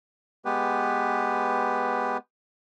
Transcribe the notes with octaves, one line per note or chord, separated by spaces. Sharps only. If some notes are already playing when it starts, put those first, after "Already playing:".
G#3 B3 G4 B4